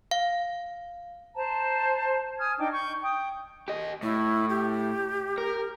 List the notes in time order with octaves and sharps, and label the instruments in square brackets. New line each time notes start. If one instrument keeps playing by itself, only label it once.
[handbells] F5
[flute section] C5 A5 A#5
G#5 D#6 F6 G#6
D4 D#4 G5 D6
C#6 G6
G5 D#6
[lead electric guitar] G4 D#5
[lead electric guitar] A2 [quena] E4
[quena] G4
[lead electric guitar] A#4